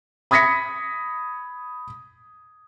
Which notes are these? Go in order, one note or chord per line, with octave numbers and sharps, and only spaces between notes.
B5 D#6 G#6 A#6 B6 C#7